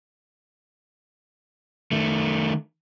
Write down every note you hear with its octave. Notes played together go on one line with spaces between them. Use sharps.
D#3 A3